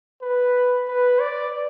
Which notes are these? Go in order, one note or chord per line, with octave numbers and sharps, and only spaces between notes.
B4
B4
D5